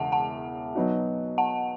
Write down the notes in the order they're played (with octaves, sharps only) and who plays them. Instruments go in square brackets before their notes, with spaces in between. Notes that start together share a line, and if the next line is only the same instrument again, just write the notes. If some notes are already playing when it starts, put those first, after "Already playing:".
Already playing: [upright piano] E1 E2 C#3 G#3 [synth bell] E5 F#5 A5
[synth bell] F#5 A5
[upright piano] B2 F#3 B3 D#4 F#4
[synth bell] F#5 A5